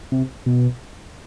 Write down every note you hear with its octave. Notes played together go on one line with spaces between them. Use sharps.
C3
B2